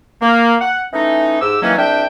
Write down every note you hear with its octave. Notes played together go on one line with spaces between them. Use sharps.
A#3
F#5
E3 A3 C#4 D#4
G#2 G4 E6
D#3 E3 F#3 A#3 C#4
C2 D4 E5 G5